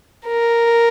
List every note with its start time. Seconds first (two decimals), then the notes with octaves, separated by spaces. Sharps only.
0.27 A#4